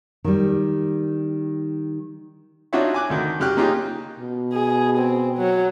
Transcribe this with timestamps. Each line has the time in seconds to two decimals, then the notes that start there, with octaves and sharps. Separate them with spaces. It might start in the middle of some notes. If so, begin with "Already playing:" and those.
0.24 D#3 G3
2.73 D4 D#4 F4 F#4 C#5 E5
2.94 G#5 D6 F#6
3.10 D2 D#3
3.39 F#2 C#3 G4 F6 F#6
3.57 A#3 C#4 D#4 F4 G4 G#4
4.19 B2
4.53 G#4
4.98 C4
5.37 F#3